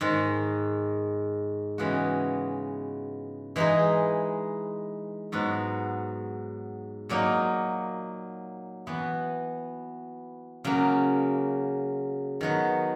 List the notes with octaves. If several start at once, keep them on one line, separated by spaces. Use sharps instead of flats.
G#2 D#3 G#3
C#3 E3 G#3 B3 F#4
E3 G#3 D#4 G#4
G#2 F#3 B3 F#4
A#2 F#3 A#3 D#4
E3 B3 F#4
C#3 F#3 A#3
D#3 F#3 B3